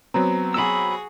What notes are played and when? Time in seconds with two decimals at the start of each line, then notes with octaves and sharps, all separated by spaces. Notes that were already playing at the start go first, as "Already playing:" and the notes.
0.14 F#3 B3 C4 A#5
0.54 F#4 G#4 B5 E6